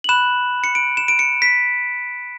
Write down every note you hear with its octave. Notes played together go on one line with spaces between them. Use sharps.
F#7
B5 F#6 E7
C#7
D7
E7
D7
C#7
B6